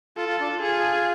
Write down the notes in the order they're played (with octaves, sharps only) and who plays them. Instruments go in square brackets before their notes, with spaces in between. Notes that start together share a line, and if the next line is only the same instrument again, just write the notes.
[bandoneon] F4 [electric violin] A4
[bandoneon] F4
D4
[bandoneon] F4 [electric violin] G#4